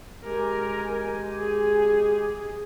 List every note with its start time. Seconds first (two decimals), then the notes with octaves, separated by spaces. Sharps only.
0.24 G#3 G4 A#4 G#5
1.39 G#4